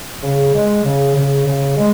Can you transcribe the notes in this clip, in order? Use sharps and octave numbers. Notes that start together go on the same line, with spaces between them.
C#3
G#3
C#3
C#3
C#3
G#3